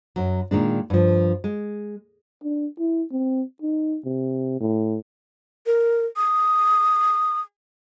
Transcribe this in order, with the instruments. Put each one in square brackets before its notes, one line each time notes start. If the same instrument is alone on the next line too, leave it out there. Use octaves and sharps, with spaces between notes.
[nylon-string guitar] F#2 F#3
A#2 D#3 G#3 D4
G2 F3
G#3
[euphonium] D4
E4
C4
D#4
C3
A2
[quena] A#4
D#6